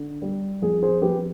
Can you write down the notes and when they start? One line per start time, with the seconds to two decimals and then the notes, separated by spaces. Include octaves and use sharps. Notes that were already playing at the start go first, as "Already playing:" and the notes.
Already playing: D3
0.22 G3
0.62 F2 G#4
0.82 G#4 C5
1.02 F2 G4 B4